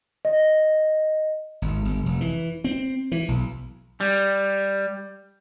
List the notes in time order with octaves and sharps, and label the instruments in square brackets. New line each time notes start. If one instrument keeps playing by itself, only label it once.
[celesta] D#5
[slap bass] G#1
G1
F1
E3
C4
E3
B1
[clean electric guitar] G3